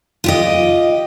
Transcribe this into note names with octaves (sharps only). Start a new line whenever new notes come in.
F4 G4 D#5